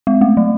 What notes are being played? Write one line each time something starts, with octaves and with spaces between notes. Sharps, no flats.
G#3
A3
F#3